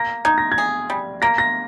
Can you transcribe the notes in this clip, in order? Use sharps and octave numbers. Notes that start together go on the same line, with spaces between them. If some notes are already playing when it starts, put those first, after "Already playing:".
Already playing: A#3 A#6
D#4 G#6
A#6
G#6
G#4
G3
A#3 A#6
A#6